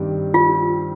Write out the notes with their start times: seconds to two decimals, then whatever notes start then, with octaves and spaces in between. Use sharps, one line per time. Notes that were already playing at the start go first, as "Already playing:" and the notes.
Already playing: G2 D#3 G3 C4 G4
0.34 F4